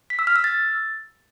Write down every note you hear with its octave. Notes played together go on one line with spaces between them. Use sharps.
B6
E6
F6
E6
A6